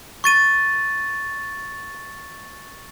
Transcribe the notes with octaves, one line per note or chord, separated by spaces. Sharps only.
C#6 A6 D#7